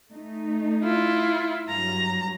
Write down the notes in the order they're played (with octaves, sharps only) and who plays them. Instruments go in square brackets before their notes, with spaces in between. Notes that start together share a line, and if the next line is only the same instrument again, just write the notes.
[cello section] A3 D#4
[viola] E4 F4
[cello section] G2 F#3 [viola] A#5